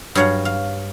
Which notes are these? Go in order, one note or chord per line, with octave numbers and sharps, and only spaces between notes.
G2 F#3 C#5 F5 F#5
F5